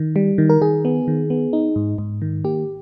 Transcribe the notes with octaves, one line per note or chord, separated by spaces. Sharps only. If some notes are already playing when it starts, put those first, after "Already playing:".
Already playing: D#3
G3
D#3
A#4
D#3 G#4
B3
D#3
B3
D#4
G#2
G#2
D#3
A#3 G4